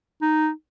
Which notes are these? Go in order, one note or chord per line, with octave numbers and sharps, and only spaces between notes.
D#4